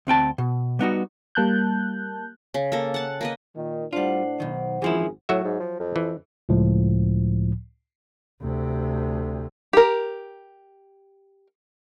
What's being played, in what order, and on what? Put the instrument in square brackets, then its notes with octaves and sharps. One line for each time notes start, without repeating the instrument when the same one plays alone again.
[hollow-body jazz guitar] D2 C4 G5 A5
B2
G3 B3 D#4 F#4
[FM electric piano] G3 A#3 A5 F#6 G6
[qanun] C#3
A#3 A4
F#5 A5
A#3 B4 D#5
[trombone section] A#2 D#3
[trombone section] A2 D4 [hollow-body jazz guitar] G3 F4 [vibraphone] C5 F#5
[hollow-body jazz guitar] B1 D#3
[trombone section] G#1 F#2 G#4 [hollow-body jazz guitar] E3 F3 E4
[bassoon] A2 [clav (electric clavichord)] F#3 F#4 E5
[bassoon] G#2
F3
F2
[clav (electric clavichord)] E3
[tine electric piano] C#2 A2 F3
[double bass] D2 C3
[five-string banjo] G4 A#4